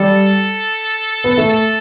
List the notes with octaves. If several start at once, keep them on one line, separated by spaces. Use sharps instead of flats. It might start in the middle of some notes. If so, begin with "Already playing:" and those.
Already playing: G3 A4
B3
A3
A4